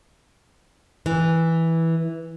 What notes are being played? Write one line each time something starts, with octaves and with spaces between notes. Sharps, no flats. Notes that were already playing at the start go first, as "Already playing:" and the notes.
E3